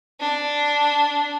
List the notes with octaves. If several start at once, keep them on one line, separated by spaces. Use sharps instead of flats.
D4